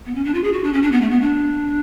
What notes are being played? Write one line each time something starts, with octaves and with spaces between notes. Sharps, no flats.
B3
C#4
D4
F4
G#4
F#4
D4
C#4
D4
B3
A3
B3
D4